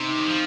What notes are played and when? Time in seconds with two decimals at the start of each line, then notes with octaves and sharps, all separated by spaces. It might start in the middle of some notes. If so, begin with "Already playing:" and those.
Already playing: C3 C4 D#4
0.19 D#3
0.27 F3